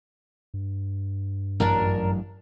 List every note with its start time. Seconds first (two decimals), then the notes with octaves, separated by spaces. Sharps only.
0.54 G2
1.60 A1 F#2 F#3 D4 A#4